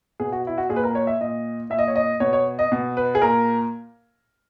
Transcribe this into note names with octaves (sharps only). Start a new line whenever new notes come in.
B2 G#4
F#4
E4
F#4
A#2 G#4
B4
A#4
C#5
E5
A#2 D#5
A#2 E5
D#5
C#5
D#5
B2 C#5
C#5
D#5
B2
B4
G#4
A#2 A#4